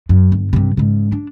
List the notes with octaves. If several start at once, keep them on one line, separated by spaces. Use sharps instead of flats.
F#2
G1
G2 C3
G#2 C#3
D4